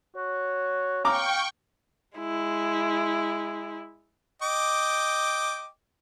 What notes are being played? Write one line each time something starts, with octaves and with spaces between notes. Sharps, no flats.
F#4 C#5
F5 G5 A#5 C#6 D6
G#3 E4
D#5 G5 D6